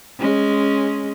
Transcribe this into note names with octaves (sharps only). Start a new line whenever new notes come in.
G#3 C#4